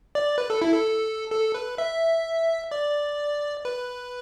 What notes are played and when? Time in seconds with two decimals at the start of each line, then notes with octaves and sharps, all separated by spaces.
0.15 D5
0.38 B4
0.50 A4
0.62 E4
0.73 A4
1.31 A4
1.54 B4
1.78 E5
2.71 D5
3.65 B4